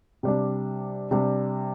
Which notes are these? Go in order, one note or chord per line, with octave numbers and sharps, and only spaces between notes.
C3 G3 D4
C3 G3 D4